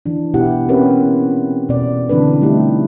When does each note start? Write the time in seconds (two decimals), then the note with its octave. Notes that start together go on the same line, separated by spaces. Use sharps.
0.06 E3 D4
0.34 B2 B3 E4 G4 F#5
0.69 C4 C#4 G4 A#4 B4 C#5
1.69 B2 D5
2.09 D3 E3 C4 D4 A4 B4
2.41 G3 A3 D#4 E4 G4